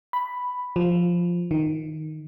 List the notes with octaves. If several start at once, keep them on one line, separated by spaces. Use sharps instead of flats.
B5
F3
D#3